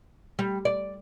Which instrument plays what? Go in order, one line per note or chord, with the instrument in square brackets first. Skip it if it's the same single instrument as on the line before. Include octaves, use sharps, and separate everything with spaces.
[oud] G3
D5